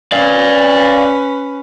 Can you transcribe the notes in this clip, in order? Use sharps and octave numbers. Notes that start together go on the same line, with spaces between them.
C#4 B4 D5 F5